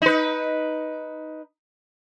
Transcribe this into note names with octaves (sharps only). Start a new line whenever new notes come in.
D#4 B4